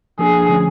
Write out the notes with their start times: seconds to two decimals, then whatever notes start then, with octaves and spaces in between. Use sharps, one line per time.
0.19 F3 A#3 D4 G#4
0.49 D3 F3 A3 C#4